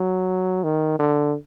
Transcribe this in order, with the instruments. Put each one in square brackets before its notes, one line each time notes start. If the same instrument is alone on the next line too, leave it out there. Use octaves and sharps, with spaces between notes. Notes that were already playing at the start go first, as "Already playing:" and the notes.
Already playing: [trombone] F#3
D#3
D3